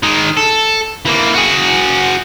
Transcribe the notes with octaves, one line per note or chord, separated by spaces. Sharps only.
D#3 G#3
A4
E3 A#3
F#4 G#4